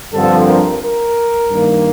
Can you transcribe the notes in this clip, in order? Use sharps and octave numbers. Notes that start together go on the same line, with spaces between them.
G2 D3 F3 C4 A4
A#4
A#4
G2 D#3 A#3